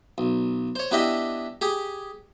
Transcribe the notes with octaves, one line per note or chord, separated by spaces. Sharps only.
B1
C5 C#5
B3 D4 E4 G4 D#5 E5
G4 G#4